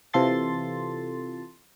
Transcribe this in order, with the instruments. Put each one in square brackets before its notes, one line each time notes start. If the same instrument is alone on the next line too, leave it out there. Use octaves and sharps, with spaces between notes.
[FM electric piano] C3 E3 F4 A4 C6 A6